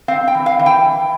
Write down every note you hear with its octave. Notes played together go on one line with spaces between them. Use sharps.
C4 F5
G5
E3
F5
E3
G5
E3